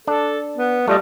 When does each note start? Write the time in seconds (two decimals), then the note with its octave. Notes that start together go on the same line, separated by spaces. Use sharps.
0.07 D4 A4
0.57 B3
0.88 G3 A3 F4 D#5